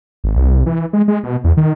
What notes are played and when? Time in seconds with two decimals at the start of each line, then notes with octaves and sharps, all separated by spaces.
0.24 G#1
0.36 C2
0.66 E3
0.93 G#3
1.08 G#3
1.23 B2
1.44 E2
1.57 D#3